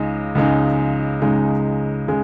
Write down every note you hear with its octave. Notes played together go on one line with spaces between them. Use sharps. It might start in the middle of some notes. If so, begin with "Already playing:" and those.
Already playing: C#2 C#3 G#3 D#4
C#2 C#3 G#3 D#4
C#2 C#3 G#3 D#4
C#3 G#3